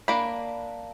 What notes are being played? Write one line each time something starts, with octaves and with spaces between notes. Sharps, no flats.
A#3 D4 B5